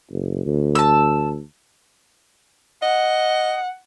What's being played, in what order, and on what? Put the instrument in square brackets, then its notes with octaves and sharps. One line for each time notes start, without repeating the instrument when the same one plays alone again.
[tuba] F#1
D2
[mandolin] A5 E6
[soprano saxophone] D#5 [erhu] F#5